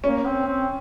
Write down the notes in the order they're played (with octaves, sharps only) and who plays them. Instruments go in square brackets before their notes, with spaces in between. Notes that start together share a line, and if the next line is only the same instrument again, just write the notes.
[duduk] A#3 [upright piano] C#4
[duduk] C4
C4